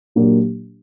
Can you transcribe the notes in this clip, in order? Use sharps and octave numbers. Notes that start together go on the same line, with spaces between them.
A#2 F#3 A#3 D4 G4